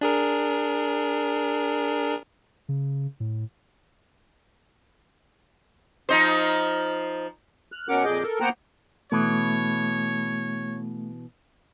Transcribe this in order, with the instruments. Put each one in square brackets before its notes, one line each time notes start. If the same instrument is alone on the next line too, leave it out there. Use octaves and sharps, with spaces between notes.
[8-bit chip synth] D4 G#4 A#4
[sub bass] C#3
A2
[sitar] F3 D#4 C5
[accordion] F6 F#6
B2 C#4 A#4 F#5 D6 F6
F2 A#2 G#4 D#5 D6 G6
A4 A#4
A#3 B3 C5 F#5 G5 A#5
[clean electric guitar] B2 E3 [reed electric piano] A3 [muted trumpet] C#5